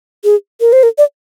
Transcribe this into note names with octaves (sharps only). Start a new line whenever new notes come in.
G#4
A#4
C5
A#4
D5